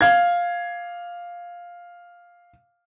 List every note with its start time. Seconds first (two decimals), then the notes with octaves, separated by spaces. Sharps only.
0.01 F5 G#6